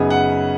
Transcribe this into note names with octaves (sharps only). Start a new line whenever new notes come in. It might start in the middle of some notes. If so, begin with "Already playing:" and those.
Already playing: F#2 C#3 B3 D#4 G#4
F#5